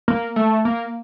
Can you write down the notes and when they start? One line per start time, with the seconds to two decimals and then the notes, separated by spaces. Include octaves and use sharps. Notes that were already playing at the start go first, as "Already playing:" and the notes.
0.08 A#3
0.36 A3
0.65 A#3